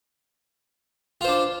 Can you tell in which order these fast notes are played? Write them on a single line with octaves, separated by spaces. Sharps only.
F4 C5 D4